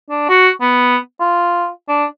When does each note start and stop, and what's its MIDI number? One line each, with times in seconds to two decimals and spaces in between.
0.10 0.25 62
0.29 0.49 66
0.61 0.97 59
1.20 1.69 65
1.88 2.05 62